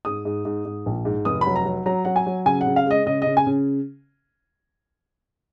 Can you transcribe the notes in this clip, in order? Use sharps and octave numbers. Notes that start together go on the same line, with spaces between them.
G#2 D#6
G#2
G#2
G#2
A#1
G#2
F1 D#6
B5
F#3
A#5
F#3
F#3 A#5
F#3 F#5
G#5
F#3
C#3 G#5
F#5
C#3
F5
G#3 D#5
C#3 D#5
C#3 D#5
G#5
C#3